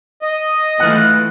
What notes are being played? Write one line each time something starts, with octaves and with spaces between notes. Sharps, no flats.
D#5
E3 A3 F4 F#5